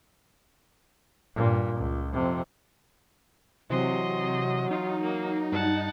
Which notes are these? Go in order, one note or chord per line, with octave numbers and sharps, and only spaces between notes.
G2 A#2
C#2
F2 C3
C3 E3 F#3 C4 D#5 C6
D#4 F4
A#3
G2 F#5 A5